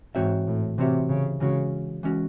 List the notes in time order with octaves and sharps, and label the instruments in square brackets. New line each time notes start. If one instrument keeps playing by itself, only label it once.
[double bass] G#2 [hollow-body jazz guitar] E3 C4 F#4 C#5 E5
[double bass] A2
[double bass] C3 [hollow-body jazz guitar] E3 C4 F#4 C#5 E5
[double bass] C#3
[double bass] C#3 [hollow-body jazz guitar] E3 G#3 C#4 F#4
[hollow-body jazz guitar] E3 G#3 C#4 F#4